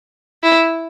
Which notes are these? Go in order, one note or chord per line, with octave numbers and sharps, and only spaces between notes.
E4